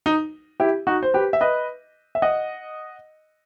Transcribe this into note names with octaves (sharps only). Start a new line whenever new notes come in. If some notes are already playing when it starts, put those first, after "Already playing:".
D#4
E4 G4
D#4 F#4
C5
G4 B4
E5
B4 D#5
E5
D#5 F#5